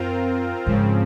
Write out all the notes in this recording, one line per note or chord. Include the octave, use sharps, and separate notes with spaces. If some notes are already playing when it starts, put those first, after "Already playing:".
Already playing: F#2 C4 F4 A#4
G#2 C#3 F3 C4